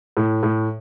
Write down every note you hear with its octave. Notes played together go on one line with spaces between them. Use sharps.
A2
A2